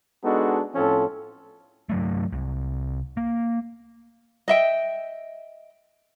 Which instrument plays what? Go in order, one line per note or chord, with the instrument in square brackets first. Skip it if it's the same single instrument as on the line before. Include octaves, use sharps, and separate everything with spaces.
[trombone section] G#3 B3 D4 D#4 F#4 A4
A2 F3 C4 C#4 A4
[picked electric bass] G2 F#3 A3
C2
A#3
[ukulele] D#5 E5 G5